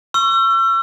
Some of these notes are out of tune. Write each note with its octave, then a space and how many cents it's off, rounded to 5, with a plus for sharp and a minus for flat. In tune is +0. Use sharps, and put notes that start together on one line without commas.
C#6 +0 E6 +40